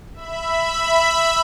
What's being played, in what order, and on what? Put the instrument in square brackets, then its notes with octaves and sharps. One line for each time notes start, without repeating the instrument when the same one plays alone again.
[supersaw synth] E5 B5